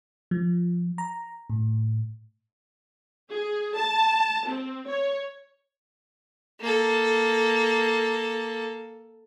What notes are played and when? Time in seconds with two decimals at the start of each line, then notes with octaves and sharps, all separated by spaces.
0.31 F3
0.98 A#5
1.50 A2
3.32 G#4
3.76 A5
4.48 C4
4.87 C#5
6.61 A#3 A4